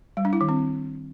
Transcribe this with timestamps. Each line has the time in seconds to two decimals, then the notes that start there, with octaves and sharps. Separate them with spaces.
0.17 G3
0.25 D4
0.33 E4
0.41 D#3
0.49 C4